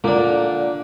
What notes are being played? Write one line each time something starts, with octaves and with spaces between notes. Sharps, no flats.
A#2 D3 D4 A#4